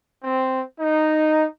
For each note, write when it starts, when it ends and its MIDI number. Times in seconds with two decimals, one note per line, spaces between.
0.23 0.60 60
0.80 1.45 63